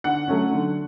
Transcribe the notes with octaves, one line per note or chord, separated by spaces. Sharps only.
D3 F#5
F#3 A3 C#4
D3